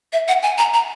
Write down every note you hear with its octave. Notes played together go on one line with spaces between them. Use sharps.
E5
F#5
G#5
A#5
A#5